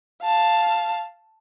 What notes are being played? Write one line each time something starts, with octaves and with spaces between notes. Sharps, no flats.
F5 A5